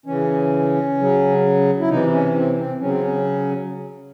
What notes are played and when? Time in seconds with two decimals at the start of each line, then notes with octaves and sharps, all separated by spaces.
0.06 C#3 E3 C#4
0.98 C#3 F#3
1.79 E4
1.88 C3 E3 D#4
2.12 C#4
2.35 C4
2.57 C4
2.80 C#3 F#3 C#4
2.90 C4
3.00 C#4